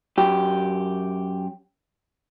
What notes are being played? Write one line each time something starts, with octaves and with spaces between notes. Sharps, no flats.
F#2 G4